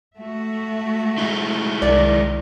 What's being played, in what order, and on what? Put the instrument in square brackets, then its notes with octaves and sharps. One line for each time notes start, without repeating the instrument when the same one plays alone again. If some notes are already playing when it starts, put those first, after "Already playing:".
[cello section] A3 F#4 E5
[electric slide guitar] G#3 D#4 E4
[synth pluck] C2 D5 [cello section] D#3 A#4